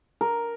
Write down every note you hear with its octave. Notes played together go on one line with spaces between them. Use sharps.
A#4